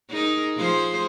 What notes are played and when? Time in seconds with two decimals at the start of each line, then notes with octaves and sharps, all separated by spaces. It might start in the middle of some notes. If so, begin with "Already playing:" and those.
0.11 D#4 G#4 A#4
0.58 F3 G#4 C5